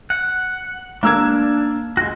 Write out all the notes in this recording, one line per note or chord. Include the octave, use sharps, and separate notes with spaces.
F#5
A#3 D4 E6 G#6
G#3 F#4